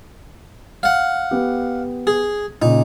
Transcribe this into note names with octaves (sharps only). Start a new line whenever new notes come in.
F5 F#5
B3 G4
G#4
A#2 C#3 D#4